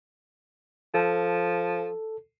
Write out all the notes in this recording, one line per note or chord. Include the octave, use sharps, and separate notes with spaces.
F3 A4